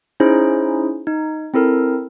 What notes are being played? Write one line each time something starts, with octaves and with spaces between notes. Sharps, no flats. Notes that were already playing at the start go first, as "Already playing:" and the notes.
C#4 D#4 E4 G#4 C5
D#4
C4 E4 A4 A#4